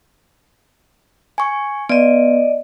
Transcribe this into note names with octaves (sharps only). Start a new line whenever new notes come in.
G#5 C#6
B3 D5 D#5